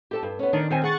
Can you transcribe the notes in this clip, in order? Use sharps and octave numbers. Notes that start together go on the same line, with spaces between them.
G4 A4 A5
G2
B3 C#4
D#3 D4
D#3 G3 C4 G#5
G#4 F#5 C#6 A6